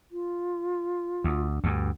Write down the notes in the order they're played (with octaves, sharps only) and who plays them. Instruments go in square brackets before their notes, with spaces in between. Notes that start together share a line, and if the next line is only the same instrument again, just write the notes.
[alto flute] F4
[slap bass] D2
D2 G2